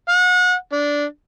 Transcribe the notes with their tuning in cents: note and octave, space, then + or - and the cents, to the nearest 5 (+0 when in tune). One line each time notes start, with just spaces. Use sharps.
F#5 -35
D4 -10